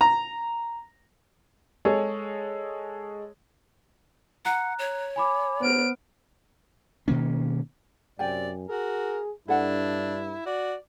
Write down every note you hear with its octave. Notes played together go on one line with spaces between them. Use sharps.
A#5
G#3 G#4 A4 C#5
F#5 A#5 F#6
C#5
G#5 B5 D6
B3 C5 F6 D7
B2 D#3 A#3 C#4
F#2 C3 D5 G5 G#5
F#4 G#4 A#4
G2 D4 E4 A4 F#5
F#4 D5